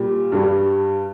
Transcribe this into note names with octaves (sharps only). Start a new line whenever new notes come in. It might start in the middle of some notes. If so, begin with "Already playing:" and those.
Already playing: A#2 G3
G2 G3